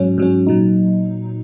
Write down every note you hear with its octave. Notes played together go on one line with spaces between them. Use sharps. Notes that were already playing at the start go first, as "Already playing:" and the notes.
Already playing: G#2 F#3 C#4
G#2 F#3 C#4
A#2 F#3 D#4